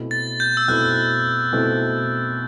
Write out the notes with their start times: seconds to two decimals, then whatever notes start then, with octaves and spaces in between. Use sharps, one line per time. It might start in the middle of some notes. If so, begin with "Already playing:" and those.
Already playing: B2 A3 C4 E4
0.11 A6
0.40 G6
0.57 E6
0.68 B2 A3 C4 E4 F#6
1.53 B2 A3 C4 E4